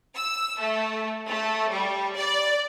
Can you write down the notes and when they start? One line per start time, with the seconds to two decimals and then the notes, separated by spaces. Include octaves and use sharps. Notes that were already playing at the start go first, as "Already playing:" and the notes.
0.16 E6
0.60 A3
1.29 A3
1.71 G3
2.17 D5